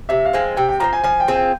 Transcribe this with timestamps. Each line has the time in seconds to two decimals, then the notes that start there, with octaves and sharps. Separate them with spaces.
0.09 C3 E5
0.25 F5
0.33 F3 G#3 C4
0.57 C3 G5
0.69 G5
0.80 F3 G#3 C4 A#5
0.93 G#5
1.04 F3 G#5
1.20 G5
1.28 C4 F4 G#4
1.35 G5